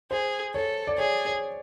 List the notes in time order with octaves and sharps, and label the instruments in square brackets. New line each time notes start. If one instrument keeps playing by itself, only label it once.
[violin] G#4 [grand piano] C5
[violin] A4 [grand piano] C#5
[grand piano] D5
[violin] G#4 [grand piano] C#5
[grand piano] C#5